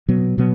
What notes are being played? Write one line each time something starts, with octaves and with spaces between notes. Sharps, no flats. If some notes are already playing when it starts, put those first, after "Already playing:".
B2 F#3 B3
B2 F#3 B3